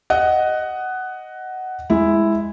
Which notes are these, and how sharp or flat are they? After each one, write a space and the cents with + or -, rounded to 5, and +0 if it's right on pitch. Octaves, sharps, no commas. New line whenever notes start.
D#5 +0 F#5 +10
G#3 -5 E4 +0